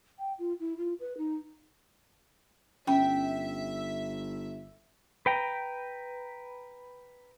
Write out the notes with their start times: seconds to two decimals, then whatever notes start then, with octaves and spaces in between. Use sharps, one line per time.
0.19 G5
0.39 F4
0.60 E4
0.78 F4
1.00 B4
1.18 D#4
2.87 G1 C#4 E5 G5 B5
5.26 B4 G5 A#5